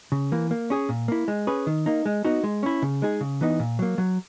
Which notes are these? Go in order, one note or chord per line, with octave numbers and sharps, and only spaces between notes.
C#3
E3 A#3
A#3
C#4 G#4 C#5
A#2
A#3 E4
G#3
C#4 G#4 B4
D#3
A#3 D#4
G#3
B3 D#4 F#4
G#3
C#4 E4
C#3
G#3 D#4 G#4
C#3
E3 B3 D#4
A#2
F#3 A#3
F#3